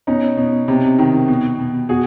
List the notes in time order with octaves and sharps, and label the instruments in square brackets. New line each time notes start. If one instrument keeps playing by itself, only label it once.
[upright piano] B2 C#4 D#4
B2
C3
D#3
B2
B2
B2 F#4 G#4